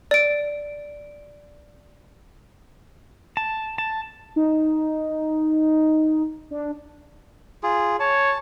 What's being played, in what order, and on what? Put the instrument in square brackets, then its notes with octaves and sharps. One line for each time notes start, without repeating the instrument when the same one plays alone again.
[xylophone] D5 D7
[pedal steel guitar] A5
A5
[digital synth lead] D#4
D4
[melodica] F4 G#4
[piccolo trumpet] C#5 [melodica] A5